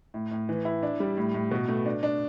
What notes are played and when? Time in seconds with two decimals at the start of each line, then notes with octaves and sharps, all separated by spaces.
0.14 A2
0.31 A2
0.49 E3
0.65 E4
0.83 D4
1.00 G3
1.17 A2
1.34 A2
1.51 B2
1.68 A3
1.86 D4
2.03 D4